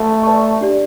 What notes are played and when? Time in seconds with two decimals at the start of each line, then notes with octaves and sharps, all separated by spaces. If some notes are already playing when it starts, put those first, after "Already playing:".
Already playing: A3
0.24 B4 D5 A5 C#6
0.61 D4 G4 D5